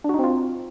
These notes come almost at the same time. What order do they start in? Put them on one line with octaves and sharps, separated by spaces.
D4 F#4 D#4 C4 F4